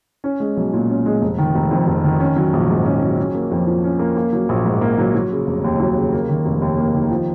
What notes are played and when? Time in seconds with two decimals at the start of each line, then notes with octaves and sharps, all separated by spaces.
0.24 C#4
0.40 G#3
0.57 B1
0.73 A#2
0.90 C#4
1.06 G#3
1.22 F1
1.38 D#3
1.55 F1
1.71 F2
1.87 F1
2.04 D#3
2.20 C#4
2.36 F#3
2.53 A#1
2.69 G#2
2.85 C#4
3.03 F#3
3.18 C#4
3.35 A#3
3.52 F2
3.67 F3
3.84 C#4
3.99 A#3
4.17 A#3
4.33 F#3
4.49 A#1
4.65 G#2
4.81 A#3
4.98 F#3
5.15 F#3
5.31 C#3
5.47 F1
5.64 D#2
5.80 F#3
5.96 C#3
6.13 A#3
6.29 D#3
6.45 F1
6.61 D#2
6.78 A#3
6.95 D#3
7.11 F3